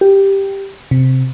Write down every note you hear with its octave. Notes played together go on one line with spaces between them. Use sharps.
G4
C3